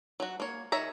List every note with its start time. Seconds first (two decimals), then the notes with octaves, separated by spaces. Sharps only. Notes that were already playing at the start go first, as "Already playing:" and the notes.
0.20 F#3 F#4
0.40 A#3 C#5
0.72 D#3 C#5 E5 A#5